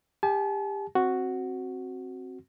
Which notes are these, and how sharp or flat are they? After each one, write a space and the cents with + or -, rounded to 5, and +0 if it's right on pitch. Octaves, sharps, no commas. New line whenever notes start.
G4 +30 A5 -40
C4 +10 F#4 +0